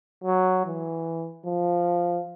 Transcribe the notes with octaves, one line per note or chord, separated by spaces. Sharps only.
F#3
E3
F3